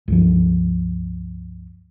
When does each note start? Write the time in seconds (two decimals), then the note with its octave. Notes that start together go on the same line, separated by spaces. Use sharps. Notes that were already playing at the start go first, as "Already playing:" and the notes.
0.08 C#2 G2 F3